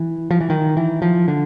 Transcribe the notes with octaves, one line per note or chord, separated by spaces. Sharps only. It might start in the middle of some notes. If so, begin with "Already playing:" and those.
Already playing: E3
F3
E3
D#3
E3
F3
D3